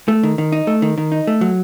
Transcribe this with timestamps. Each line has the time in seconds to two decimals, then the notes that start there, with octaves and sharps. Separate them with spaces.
0.08 A3
0.23 D#3
0.38 D#3
0.52 D#4
0.67 A3
0.82 D#3
0.98 D#3
1.12 D#4
1.27 A3
1.41 F#3